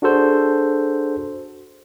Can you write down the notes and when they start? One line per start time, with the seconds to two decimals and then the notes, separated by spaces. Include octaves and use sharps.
0.02 D4 F#4 G#4 A4 C5